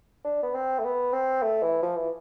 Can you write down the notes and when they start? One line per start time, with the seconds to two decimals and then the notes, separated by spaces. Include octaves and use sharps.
0.24 D4
0.43 B3
0.54 C4
0.79 A3
0.85 B3
1.13 C4
1.42 A3
1.62 E3
1.82 F3
1.96 E3